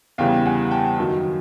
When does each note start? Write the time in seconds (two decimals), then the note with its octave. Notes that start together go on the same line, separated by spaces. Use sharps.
0.18 E2 C#3 E3 G3 F5 G5
0.46 F#5 G#5
0.71 G5 A5
0.98 F#2 D#3 F#3